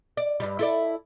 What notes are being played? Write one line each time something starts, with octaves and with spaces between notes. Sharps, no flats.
D5
G2 G3
E4 A4 D5